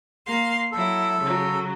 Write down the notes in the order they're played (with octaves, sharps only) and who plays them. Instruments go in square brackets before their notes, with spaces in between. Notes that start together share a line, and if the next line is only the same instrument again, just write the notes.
[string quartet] A#3 F5 C6
[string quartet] F#3 E4 [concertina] A4
[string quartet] C#3 F#3